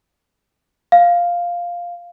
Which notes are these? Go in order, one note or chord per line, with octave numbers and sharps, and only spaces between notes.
F5